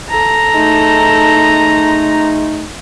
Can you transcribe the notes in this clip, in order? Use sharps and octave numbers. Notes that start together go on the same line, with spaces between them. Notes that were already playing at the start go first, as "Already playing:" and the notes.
A4 A#5
G#3 A3 D#4